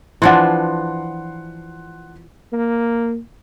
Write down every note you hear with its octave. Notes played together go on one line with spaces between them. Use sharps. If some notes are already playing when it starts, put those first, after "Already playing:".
E3 F3 D4 F#5 C6
A#3